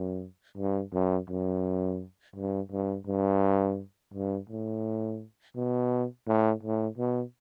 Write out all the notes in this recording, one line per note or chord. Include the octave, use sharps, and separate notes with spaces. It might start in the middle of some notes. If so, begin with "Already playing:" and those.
Already playing: F#2
G2
F#2
F#2
G2
G2
G2
G2
A2
B2
A2
A2
B2